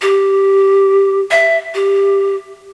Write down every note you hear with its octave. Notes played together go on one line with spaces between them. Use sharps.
G4
E5
G4